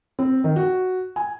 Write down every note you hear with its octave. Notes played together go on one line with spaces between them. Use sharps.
C4
D#3
F#4
G#5